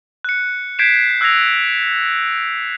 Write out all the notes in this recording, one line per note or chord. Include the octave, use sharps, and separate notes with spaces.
F#6 C#7
G6 G#6 B6 C7 D7 E7
E6 F#6 G#6 A#6 F7